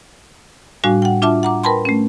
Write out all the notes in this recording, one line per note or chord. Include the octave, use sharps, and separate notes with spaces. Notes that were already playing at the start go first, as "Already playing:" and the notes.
A2 G3 D4 F#4 F5 G#5
F#5 G5
D4 F4 E5 A5 D6
F#5 A#5 D6
A#4 B4 G5 A5 B5 C6
A3 C#4